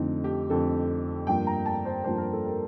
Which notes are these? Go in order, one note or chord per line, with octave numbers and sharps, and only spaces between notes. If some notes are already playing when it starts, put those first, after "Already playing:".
Already playing: F2 D3 A3 C4 D#4
G4
F2 D3 A3 C4 A4
G2 F3 A#3 G5
A#5
A5
C5
G2 F3 A#3 C5
A#4
A4
A#4